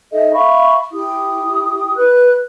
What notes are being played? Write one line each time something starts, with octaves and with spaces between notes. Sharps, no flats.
D#4 A4 D#5 E5
E5 F5 B5 C#6
E4 G4 D#6
B4 F#6